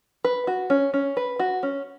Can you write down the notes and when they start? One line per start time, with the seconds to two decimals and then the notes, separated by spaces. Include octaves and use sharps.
0.25 B4
0.47 F#4
0.70 C#4
0.94 C#4
1.17 B4
1.39 F#4
1.63 C#4